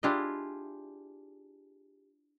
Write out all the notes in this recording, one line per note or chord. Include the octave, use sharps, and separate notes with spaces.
D4 E4 F4 G4 G#4 D#5